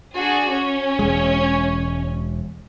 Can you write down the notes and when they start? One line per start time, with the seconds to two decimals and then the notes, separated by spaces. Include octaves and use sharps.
0.15 D4 F#4 G#4
0.52 C#4 C#5
0.99 E1 G#3